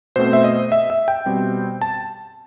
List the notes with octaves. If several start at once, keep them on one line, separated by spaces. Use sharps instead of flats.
B2 A3 C4 C5
E5
D#5
E5
E5
G5
B2 G3 C4
A5